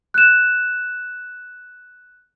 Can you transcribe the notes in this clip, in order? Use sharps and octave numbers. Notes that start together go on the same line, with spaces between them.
F#6 E7